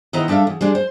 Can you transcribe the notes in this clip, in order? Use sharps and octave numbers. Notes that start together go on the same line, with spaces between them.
D#3 B3 E4 C5 D#5 A#5
G3 D4 A4 E5 F5
E2
G3 G#3 D4
C5